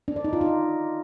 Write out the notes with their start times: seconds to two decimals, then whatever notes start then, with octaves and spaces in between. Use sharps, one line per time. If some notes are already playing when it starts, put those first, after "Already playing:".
0.08 D4
0.16 D5
0.24 D#4
0.33 F4
0.41 D#4